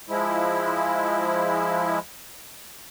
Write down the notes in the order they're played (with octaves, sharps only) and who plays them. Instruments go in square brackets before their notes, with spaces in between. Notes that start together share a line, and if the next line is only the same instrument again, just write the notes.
[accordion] F3 G#3 E4